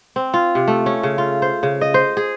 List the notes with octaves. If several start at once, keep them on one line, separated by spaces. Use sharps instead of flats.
C4
F4
C3
A3
C#4
C#3
F4
C5
C#3
D#5
C5
G#4